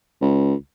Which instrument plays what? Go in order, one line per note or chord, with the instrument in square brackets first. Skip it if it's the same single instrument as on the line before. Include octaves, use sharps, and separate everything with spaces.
[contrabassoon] C#2